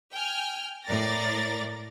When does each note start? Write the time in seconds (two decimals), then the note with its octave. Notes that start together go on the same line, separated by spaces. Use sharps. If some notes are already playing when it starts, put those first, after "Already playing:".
0.13 G5 G#5 F6
0.85 A2 A#4 D5 A6 A#6